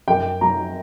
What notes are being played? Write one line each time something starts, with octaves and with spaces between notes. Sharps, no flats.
F#2 G5
F#3 A#5